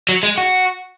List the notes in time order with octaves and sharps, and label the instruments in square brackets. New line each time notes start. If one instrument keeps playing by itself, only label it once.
[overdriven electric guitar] F#3
G#3
F#4